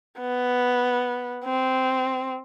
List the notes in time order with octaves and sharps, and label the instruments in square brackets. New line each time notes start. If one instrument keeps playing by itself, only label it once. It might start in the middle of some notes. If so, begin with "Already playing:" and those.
[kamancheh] B3
C4